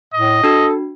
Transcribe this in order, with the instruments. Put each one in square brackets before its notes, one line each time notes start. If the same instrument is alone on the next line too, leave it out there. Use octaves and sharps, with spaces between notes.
[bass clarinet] A2 [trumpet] D#5
[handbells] D4 F#4 [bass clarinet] A4